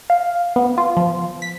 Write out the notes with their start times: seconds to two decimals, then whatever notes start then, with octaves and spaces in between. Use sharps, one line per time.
0.10 F5
0.56 B3
0.78 F4
0.97 F3
1.42 B6